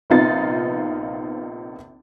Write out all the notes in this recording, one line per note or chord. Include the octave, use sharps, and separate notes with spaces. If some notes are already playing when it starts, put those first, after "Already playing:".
A#1 C3 B3 D#4 F4 A6